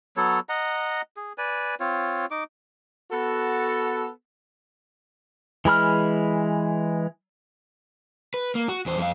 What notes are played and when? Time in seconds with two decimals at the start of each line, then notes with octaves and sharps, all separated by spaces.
0.17 F#3 B3 A4 C#5
0.49 D#5 F#5 A#5
1.17 G#4
1.38 B4 D5 G#5
1.80 C4 F4 C#5
2.31 D#4 D6
3.12 B3 F#4 A4
5.65 E3 G#3 B5 F6
8.34 B4
8.55 A#3
8.69 F#4
8.86 E2 C5
8.98 F2 F5